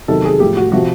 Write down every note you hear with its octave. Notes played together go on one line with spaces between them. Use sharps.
E2 C3 D#3 F#3 A4
G#4
A2 F3 G4
F#4
C3 F3 F#4